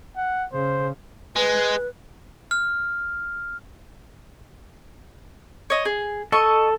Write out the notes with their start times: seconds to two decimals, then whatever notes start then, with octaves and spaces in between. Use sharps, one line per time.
0.16 F#5
0.53 C#3 C5
1.36 G#3 B4
2.51 F6
5.70 C#5 D#5
5.85 G#4
6.32 A4 D#5 C#6